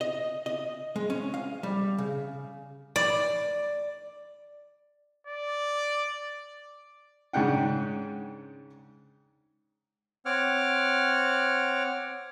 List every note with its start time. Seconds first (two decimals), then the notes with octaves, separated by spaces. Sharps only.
0.01 D#5
0.46 D#5
0.96 G#3
1.10 C#4
1.34 F5
1.63 G3
1.98 C#3
2.96 D5
5.27 D5
7.33 G#2 C#3 C#4 D4 F#5 G5
10.26 C4 C#5 F#5 D6 F6